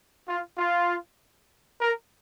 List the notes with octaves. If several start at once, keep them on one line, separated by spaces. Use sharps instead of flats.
F4
F4
A#4